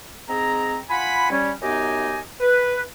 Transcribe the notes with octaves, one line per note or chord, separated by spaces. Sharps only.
G#2 C4 G#4 A#5
F4 F#5 G#5 B5
G3 C#4
F#2 B3 D#4 G4 D#5 G#5
B4